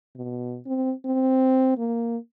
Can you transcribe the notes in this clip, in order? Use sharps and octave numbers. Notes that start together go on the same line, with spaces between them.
B2
C4
C4
A#3